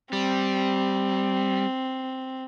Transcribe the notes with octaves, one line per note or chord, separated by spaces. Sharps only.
G3 C4